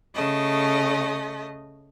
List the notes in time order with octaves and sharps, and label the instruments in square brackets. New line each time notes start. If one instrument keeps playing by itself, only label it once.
[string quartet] C#3 A3 D#5